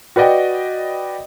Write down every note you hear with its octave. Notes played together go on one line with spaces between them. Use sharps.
F#4 B4 D5 D#5 G5